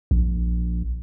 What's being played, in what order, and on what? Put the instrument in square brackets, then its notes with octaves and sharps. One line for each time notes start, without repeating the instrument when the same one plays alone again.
[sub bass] A#1